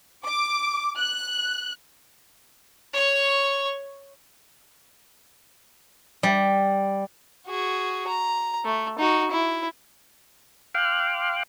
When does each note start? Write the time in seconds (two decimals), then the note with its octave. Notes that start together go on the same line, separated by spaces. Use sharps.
0.24 D6
0.98 F#6
2.93 C#5 C#6
6.23 G3
7.47 F#4 G#4
8.08 A#5
8.64 A3
8.99 D#4 F#4
9.31 E4
10.75 F5 G5 C6 D6 F6 F#6